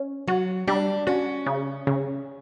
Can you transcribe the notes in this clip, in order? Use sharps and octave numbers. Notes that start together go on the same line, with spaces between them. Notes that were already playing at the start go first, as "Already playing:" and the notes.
Already playing: C#4
F#3 F#4
G3 D4
C#4 F#4
C#3
C#3